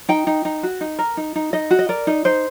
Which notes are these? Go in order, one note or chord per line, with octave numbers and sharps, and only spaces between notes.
D#4 G5
D#4
D#4
F#4
D#4
A#4
D#4
D#4
D#4 D#5
F#4
D#5
A#4 D5
D#4
D#4 C5